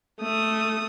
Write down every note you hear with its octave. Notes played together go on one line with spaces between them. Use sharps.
A3 D#6